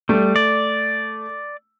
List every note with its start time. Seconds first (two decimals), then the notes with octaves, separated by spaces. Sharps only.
0.09 G3 A3
0.36 D5